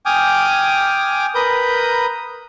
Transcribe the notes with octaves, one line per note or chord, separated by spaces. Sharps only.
G5 G#5 D6 D#6 F6
A#4 B4 B5 D#6 G6